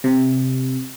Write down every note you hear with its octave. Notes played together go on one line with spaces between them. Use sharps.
C3